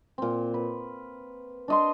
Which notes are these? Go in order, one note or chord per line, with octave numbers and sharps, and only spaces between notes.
A#2 C4
B4
D4 D#5 C6